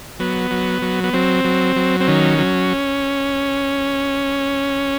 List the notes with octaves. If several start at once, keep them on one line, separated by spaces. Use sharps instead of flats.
F#3 B3
F#3
F#3
B3
F#3 C4
F#3
F#3
C4
D#3 C#4
F#3